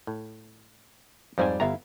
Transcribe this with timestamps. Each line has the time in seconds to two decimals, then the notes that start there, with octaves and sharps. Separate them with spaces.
0.07 A2
1.38 F2 G#2 G3 C5 D5 G#5
1.60 G1 B3 E4 E5 F5 A#5